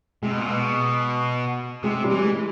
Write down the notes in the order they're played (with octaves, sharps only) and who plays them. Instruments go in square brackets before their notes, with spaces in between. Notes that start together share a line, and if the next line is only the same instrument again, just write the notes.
[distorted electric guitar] C3 [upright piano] G#3
[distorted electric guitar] B2
A#2
B2
[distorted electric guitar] C3 [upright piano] G#3
[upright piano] G3
[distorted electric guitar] E3
[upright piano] G#3